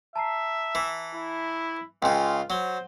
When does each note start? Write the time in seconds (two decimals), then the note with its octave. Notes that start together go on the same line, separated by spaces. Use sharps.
0.16 E5 A5 A#5 C7
0.75 E3
1.14 E4
2.03 C#2 C#3 F4 G5 G#5
2.50 F#3 C5 F#5 G7